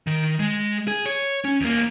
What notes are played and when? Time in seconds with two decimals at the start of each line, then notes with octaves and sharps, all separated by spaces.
0.07 D#3
0.40 G#3
0.88 G#4
1.06 C#5
1.45 C#4
1.61 E2 A#3